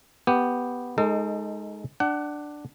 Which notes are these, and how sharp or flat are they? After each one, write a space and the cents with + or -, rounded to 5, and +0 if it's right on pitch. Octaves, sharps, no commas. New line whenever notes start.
B3 +0 G4 +0
G#3 +15 D#4 +0 A4 +40
D4 +5 F#5 +25